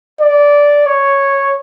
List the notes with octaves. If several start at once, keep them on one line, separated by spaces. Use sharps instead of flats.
D5
C#5